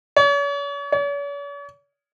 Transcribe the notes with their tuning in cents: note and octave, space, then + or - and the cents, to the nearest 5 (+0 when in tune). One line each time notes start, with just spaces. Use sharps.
C#5 +40
C#5 +45